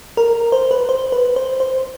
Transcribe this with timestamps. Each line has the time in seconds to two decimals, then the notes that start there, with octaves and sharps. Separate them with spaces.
0.17 A#4
0.52 C5
0.71 B4
0.89 C5
1.12 B4
1.36 C5
1.60 C5